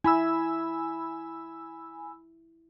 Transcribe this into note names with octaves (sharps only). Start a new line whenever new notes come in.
E4 G#5 B5 E6